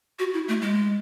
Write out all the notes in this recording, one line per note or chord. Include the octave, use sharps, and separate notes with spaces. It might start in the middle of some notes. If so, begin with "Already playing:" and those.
F#4
E4
A3
G#3